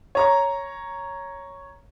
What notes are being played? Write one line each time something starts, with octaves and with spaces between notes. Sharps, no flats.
C#5 A#5 C#6